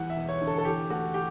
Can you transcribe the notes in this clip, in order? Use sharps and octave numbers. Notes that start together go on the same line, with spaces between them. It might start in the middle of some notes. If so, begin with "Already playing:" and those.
Already playing: E2 G3 F#5
E5
E1
C#5
D3
A4
A4
E2 G4
A3 F#4
G4